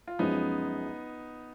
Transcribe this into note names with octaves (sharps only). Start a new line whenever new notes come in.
F4
F#2 F3 G#3 B3 C#4 D#4